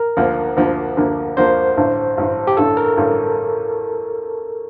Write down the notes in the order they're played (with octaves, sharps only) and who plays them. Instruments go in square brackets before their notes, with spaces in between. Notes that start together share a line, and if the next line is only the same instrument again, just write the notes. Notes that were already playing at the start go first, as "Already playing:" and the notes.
Already playing: [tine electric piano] A#4
[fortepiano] D2 D3 F3 A#3
D2 D3 F3 A#3
D2 D3 F3 A#3
[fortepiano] D2 D3 F3 A#3 [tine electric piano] C5
[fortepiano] A1 G2 D3
A1 G2 D3
[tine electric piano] G4
[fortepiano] A1 G2 D3 [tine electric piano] A4
[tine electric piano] A#4
[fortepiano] A1 G2 D3